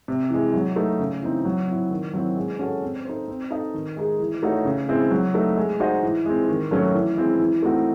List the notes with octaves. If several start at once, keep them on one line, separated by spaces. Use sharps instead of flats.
C3
E3 G#3
F#3
A3 D#4
C#3
E3 C4 D#4
F#3
C4 E4
D#3
F#3 C4 E4
G#3
C#4 F#4 A4
C4
D#4 A4 C5
C4
D#4 A4 D#5
D#3
G#3 D#4 G#4
E3
A3 D#4 F#4 C#5
C#3
G#3 C4 E4
F#3
A3 D#4
G#3
D#4 F#4 C5 D#5
E3
G#3 C4
D#3
F#3 A3 C#4
E3
G#3 C4 E4
E3
A3 C4 D#4 F#4